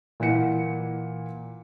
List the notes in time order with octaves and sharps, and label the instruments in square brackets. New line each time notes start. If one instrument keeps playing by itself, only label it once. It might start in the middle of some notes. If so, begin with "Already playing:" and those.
[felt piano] A#2 E3 F#5 C#7